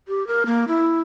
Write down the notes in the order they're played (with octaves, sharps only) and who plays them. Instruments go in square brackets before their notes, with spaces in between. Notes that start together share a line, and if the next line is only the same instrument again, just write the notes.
[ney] G4
A#4
A#3
E4